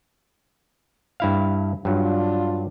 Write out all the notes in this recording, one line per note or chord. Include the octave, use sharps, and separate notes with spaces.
G2 E4 F5
G2 F#3 D4 F4